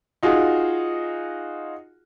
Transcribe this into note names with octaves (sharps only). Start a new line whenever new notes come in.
D#4 F4 F#4 G#4